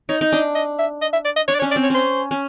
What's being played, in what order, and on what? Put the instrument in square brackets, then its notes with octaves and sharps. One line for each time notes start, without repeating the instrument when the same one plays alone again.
[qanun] D#4 [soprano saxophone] C#5
[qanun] D#4
[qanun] D4 [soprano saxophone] D#5
[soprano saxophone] D#5
E5
D#5
E5
D5
D#5
[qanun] D4 [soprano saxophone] C#5
[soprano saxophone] D5
[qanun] C#4 [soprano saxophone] C#5
[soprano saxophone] D5
[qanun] C4
[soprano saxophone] C#5
[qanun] C#4 [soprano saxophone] C5
[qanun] C#4